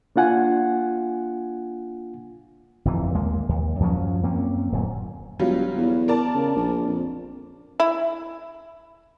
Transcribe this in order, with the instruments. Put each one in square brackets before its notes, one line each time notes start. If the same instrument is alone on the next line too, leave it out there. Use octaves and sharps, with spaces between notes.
[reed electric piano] A#3 D4 F4 F#5 G#5
[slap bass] G1 F2 A#2 E3
D#2 G#3 A#3
D#2
F#2 F3 F#3 C#4
F#2 A#3 C4 C#4
D1 F#2 A#2
[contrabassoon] E1 [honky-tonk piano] F#3 G3 F4
[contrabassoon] E2
[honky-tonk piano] A#4 D5 A5
[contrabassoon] C#3
A#1
F2
[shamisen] E4